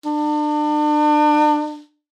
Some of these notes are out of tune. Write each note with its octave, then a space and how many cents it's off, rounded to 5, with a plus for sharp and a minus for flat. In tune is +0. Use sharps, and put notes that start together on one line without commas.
D4 +35